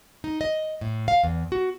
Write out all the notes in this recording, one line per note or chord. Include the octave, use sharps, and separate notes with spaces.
D#4
D#5
A2
F5
E2
F#4